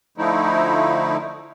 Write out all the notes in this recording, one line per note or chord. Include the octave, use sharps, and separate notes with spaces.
D3 F3 A3 D#4 E4